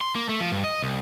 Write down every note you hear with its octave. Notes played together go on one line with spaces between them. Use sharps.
C6
A#3
A3
F3
G2
D#5
C2